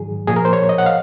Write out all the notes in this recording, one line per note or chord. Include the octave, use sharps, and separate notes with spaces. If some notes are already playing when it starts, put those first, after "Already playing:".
Already playing: G#2 D#3 F#3 G#4
A#2 F3 G#4
A#4
C5
C#5
D#5
F#5
F5